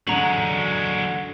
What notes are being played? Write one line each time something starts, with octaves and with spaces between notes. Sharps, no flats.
D3 F#3 G#3 A#5 F#7